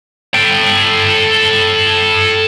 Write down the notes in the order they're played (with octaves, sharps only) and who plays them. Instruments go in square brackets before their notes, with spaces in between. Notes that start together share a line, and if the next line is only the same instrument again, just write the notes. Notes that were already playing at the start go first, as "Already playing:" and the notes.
[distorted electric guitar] A4 G5